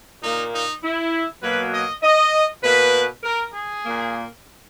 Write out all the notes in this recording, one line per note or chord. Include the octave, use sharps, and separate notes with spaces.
A#2 A#3 D#4
D#4
E4
B2 F#3 A#3 B4
D#5
D#5
B2 A#3 B4
A#4
G#4
A#2 A#3